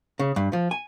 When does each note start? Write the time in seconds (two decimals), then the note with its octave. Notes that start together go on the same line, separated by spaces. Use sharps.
0.19 C#3
0.36 G2
0.53 F3
0.71 G#5